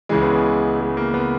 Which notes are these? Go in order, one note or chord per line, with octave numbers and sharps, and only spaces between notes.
C#2 C#3 E3 G#3
B3
B3
G#3
A#3
B3